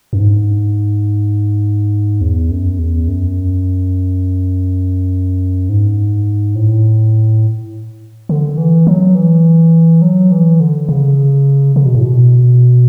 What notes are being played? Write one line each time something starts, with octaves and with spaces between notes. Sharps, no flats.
F#2
G#2
E2
F#2
E2
F#2
G#2
A2
D3
E3
F#3
E3
F#3
E3
D3
C#3
C#3
B2
A2
B2